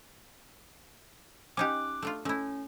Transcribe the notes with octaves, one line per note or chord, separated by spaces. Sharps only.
C#4 D#4 G4 D6 F#6
A3 D4 F4
A3 C#4 E4